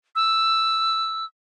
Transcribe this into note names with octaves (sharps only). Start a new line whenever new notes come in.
E6